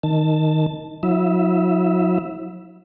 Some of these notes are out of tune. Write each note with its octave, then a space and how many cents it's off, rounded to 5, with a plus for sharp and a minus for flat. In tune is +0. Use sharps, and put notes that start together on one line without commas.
D#3 +0 A5 +0
F#3 -40 E4 -35 E5 +5